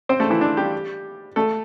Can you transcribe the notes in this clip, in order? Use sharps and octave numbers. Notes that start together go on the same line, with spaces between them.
C4 C5
A3 A4
E3 E4
D4
G3 G4
A3 A4